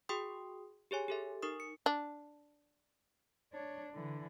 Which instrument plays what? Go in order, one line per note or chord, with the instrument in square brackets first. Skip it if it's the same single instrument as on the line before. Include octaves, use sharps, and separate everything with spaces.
[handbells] F#4 G#4 G5 C6 D#6
G4 G#4 C#5 G#5
G4 A4 E5
D#4 A#4 C#6 D#6
C#7
[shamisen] D4
[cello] D4 C#5
D3 E3